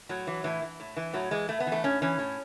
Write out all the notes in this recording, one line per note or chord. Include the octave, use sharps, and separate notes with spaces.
A2 F#3
E3
A2 E3
E3
A2
E3
A2 F#3
E3 G#3
A2 A3
B3
E3
A3
A2 C#4
E3 C#4
A2